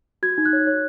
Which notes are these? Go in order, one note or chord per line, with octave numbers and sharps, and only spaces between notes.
F#4 G#6
D#4
F#6
C#5
C#5